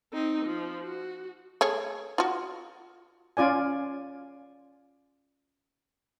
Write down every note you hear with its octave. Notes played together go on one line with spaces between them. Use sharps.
C4 D#4
F3
F#4
A3 G#4 C#5
F4 F#4
C#4 F4 D5 G#5